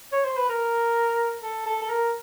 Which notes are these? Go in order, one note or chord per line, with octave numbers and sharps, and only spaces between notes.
C#5
C5
B4
A#4
A4
A4
A4
A#4